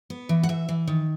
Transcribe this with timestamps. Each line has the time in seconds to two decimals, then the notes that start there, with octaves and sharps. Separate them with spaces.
0.10 B3
0.29 E3
0.43 F#5
0.49 E3 E5
0.69 E3
0.87 D#3